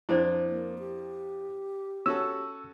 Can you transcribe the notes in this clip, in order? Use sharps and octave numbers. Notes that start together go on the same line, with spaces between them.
F2 D4 E4 C5 D5
A#3
G4
C#4 F#4 A4 E6